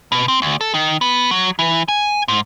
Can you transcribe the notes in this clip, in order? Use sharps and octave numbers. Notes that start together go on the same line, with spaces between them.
B2
C4
D2
A4
D#3
B3
F#3
E3
G#5
G#2